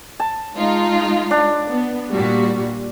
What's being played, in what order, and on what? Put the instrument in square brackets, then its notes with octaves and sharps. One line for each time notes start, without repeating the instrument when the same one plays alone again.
[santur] A5
[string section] G#3 D#4 F4
[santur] D4
[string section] B3
A#2 G3 F#4